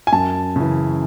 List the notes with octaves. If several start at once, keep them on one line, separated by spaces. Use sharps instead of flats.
G#5
F#2 A5
C#3 E3